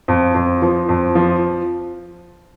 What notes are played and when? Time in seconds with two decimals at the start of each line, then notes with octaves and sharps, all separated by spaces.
0.08 F2
0.35 F2
0.62 F3
0.89 F2
1.15 F3